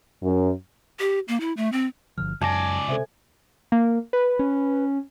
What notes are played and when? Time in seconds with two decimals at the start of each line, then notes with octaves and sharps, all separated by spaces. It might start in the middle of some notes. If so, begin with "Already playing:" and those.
0.22 F#2
0.99 G4
1.28 A#3
1.40 E4
1.57 A3
1.72 C4
2.18 G1 D3 F3 F6
2.41 C#2 F#2 D5 G#5 A5 D6 A#6
2.88 C3 A4 C5 E5
3.72 A#3
4.13 B4
4.39 C#4